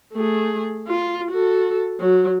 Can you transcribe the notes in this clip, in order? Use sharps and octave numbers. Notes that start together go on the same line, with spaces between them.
A3 G#4
F4
F#4 A4
F#3